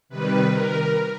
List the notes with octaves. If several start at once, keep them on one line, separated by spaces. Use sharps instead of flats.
C3 D#3 G3 B4
A#4